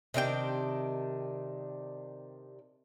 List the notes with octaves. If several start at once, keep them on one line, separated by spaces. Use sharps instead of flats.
C3 D#3 D4 G5